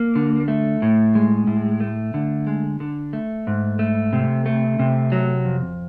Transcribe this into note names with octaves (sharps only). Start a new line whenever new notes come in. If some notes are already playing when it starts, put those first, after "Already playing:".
Already playing: A#3
D3
A3
A2
G#3
A2
A3
D3
G#3
D3
A3
G#2
A3
C3
A3
C3
F#3
F2